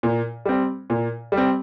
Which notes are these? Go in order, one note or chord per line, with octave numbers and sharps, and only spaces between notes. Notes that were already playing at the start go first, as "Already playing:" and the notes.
A#2
G3 C4
A#2
G3
C4